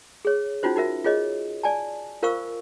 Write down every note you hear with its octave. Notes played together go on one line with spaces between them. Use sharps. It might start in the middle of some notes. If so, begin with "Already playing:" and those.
G#4 C#5
C#4 D#4 F4 F#4 C5
D#4 F#4 A#4 E5
F4 G#4 C#5 D#5
D5 G#5 A5
F4 A#4 C5 F5 C#6 E6